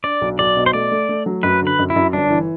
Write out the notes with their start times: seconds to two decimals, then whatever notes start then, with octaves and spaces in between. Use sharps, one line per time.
0.04 D4 D5
0.21 B1
0.39 B1 D5
0.57 B2
0.66 C5
0.73 A3 D5
0.92 A3
1.09 A3
1.26 F#3
1.43 F#2 B4
1.62 D3 B4
1.79 F#2
1.90 E4
1.96 F#2
2.13 G1 D4
2.30 E3